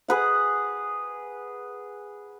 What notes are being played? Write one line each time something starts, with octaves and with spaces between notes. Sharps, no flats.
G#4 B4 F#5